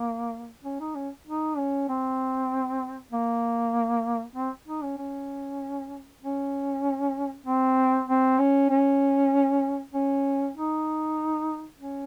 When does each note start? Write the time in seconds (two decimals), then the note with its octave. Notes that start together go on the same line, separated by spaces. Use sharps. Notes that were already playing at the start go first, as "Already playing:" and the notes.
Already playing: A#3
0.64 C#4
0.80 D#4
0.95 C#4
1.27 D#4
1.58 C#4
1.89 C4
3.12 A#3
4.36 C4
4.68 D#4
4.83 C#4
4.98 C#4
6.23 C#4
7.46 C4
8.08 C4
8.39 C#4
8.70 C#4
9.94 C#4
10.56 D#4
11.80 C#4